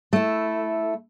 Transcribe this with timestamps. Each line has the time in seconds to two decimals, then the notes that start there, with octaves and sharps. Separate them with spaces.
0.13 A3 E4